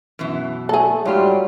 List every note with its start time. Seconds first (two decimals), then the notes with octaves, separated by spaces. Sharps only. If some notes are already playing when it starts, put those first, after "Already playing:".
0.19 F#2 B2 E3
0.69 A3 G#4 A4
1.05 G#2 F#3 G3 F4 G4